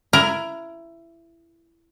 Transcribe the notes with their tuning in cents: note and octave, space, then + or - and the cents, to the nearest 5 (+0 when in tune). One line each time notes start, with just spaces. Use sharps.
E4 +20 A#4 +10